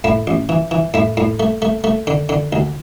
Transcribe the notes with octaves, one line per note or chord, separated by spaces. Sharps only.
A2 E4
A1
E3
E3
A2 E4
A2
A3
A3
A3
D3
D3
D2